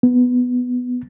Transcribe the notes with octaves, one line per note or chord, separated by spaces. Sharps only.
B3